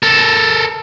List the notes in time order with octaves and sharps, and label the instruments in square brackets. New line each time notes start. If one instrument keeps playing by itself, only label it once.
[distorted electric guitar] A4 A#4